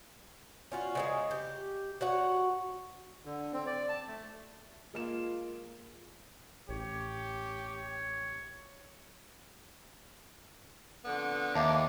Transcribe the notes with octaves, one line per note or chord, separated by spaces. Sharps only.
C#4 F4 F#4
C#3 E3 G#3
G4
F#4 C#5 F#5
D3
C4
D5
A5
A3
G#3 A#3 F4 E7
A1 G4 C#5
F2 D3 B3
D#2 E5 F5 A5 D6